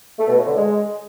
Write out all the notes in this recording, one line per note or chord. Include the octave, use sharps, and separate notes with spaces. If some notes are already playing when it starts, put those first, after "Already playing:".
A3
B2
A2
D3
G#3